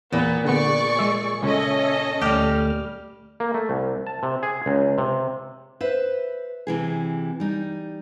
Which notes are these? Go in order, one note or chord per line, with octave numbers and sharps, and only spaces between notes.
E2 A#2 B3
D3 B3 G#4 D5 C#6
G#3 E5
C#2 C#4 A4 C#5 D#5 E5 G#5
D2 G3 A3 G4 F6
A#3
A3
C2
A5
C3
G#4
C#2
C3
B4 C5 E5
C3 E3 G#4
G3 D#4